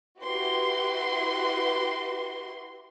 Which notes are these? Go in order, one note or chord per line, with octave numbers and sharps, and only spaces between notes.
E4 F#4 G4 B4 C6